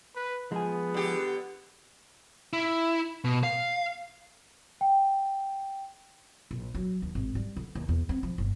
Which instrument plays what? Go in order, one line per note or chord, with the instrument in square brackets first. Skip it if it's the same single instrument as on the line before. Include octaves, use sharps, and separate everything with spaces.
[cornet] B4
[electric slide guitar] F3 [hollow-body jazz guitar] G#3 G#4 [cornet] B3
[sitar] D3 G4
[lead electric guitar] E4
B2
F5
[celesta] G5
[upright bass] A#1
F#3
D#2
G#1
G3
D3
D#2
E2
C4
F3
G1